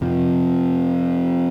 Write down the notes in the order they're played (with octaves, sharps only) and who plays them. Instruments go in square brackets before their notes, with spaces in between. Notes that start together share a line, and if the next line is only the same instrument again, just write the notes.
[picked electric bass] F2 C3 F3